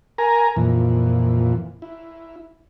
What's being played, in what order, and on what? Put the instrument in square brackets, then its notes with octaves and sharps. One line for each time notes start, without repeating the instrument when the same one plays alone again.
[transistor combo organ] A#4 G#5 A#5
F2 A#2 E3
E4